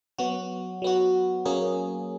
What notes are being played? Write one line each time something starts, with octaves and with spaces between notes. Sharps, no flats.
F#3 B3 F#4
F#3 B3 F#4
F#3 A#3 C#4 G#4